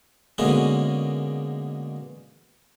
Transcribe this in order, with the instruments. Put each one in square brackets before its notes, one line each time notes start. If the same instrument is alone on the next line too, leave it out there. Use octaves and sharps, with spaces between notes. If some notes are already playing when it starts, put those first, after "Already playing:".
[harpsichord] B2 D3 G#3 A#3 C#4